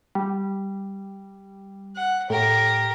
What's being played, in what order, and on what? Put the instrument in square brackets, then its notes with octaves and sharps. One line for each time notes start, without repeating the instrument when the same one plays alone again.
[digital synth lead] G3
[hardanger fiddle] F#5
[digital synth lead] A2 [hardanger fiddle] G4 A#4